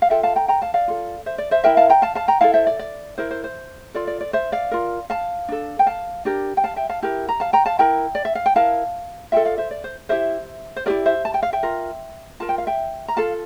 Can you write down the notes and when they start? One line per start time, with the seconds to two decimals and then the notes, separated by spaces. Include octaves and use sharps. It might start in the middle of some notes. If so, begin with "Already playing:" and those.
0.02 F5
0.10 F4 A4 E5 G5
0.23 F5 A5
0.36 G5 A#5
0.48 G5 A#5
0.62 F5 A5
0.74 D5 F5
0.88 F4 A4
1.26 C5 E5
1.38 D5
1.51 C5 E5
1.64 E4 A#4 E5 G5
1.77 F5 A5
1.89 G5 A#5
2.02 F5 A5
2.15 F5 A5
2.28 G5 A#5
2.41 E4 F5 A5
2.44 A4
2.54 C5 E5
2.67 D5
2.79 D5
3.18 E4 A#4 C5
3.31 C5
3.44 C5
3.94 F4 A4 D5
4.07 D5
4.21 D5
4.33 C5 E5
4.52 D5 F5
4.71 F4 A#4
5.10 F5 A5
5.48 D4 A4
5.79 G5
5.87 F5 A5
6.25 D4 G4 A#4
6.57 G5
6.64 F5 A5
6.76 E5 G5
6.89 F5 A5
7.02 E4 G4 A#4
7.28 A#5
7.40 F5 A5
7.53 G5 A#5
7.66 F5 A5
7.79 E4 A#4 G5 A#5
8.15 D5
8.25 E5
8.35 F5
8.46 G5
8.55 E4 A#4 F5 A5
9.32 F4 A4 E5 G5
9.45 D5 F5
9.58 C5 E5
9.71 D5
9.84 C5
10.09 E4 G4 A#4 C5 E5
10.76 C5
10.86 E4 G4 A#4 D5
11.06 C5 E5
11.25 A5
11.34 G5
11.43 F5
11.53 E5 G5
11.63 F4 A#4
12.40 F4 A#4 A5
12.49 G5
12.58 F5
12.67 E5 G5
13.08 A#5
13.17 F4 A4 F5 A5